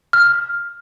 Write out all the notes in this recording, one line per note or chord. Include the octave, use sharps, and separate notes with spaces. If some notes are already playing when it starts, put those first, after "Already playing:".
F6